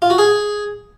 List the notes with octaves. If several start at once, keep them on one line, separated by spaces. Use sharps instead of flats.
F4
F#4
G#4